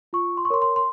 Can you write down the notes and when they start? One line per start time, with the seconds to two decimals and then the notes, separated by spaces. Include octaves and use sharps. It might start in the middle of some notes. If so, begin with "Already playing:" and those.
0.13 F4 C#6
0.37 C6
0.45 C#6
0.50 A#4 C#5 C6
0.62 C6
0.76 C6